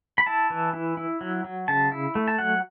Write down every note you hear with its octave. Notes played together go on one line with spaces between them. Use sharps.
B5
E4 A5
E3
E4
E4
F#3
F#3
C#3 A5
E4
A3
A5
F#3 F#5